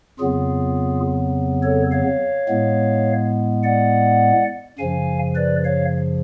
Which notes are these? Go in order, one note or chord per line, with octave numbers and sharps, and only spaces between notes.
F2 C#3 F#3 B3 F4 G#4
A4 C#5
C#5 F5
A2 G#3 B3
D5 F#5
F#2 C#3 F3 F5 G#5
B4 D5
C#5 F5